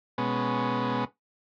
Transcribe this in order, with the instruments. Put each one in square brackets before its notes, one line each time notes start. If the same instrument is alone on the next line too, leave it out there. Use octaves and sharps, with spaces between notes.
[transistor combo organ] B2 G#3 B3 C#4